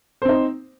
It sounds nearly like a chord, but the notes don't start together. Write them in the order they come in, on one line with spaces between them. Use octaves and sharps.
C5 C4 D#4